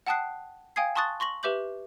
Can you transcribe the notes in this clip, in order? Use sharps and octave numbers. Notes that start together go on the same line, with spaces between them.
F#5 G5 A5 D#6 F#6 C7
F5 G5 G#5 D#6 G#6 C7
A5 C6 C#6 D#6 F#6 A6
C6 C#6 A#6 F#7
G4 B4 E5 D6 G6 F#7